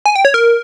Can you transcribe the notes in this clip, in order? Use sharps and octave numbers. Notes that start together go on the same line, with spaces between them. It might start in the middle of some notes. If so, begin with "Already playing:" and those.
G#5
G5
C#5
A#4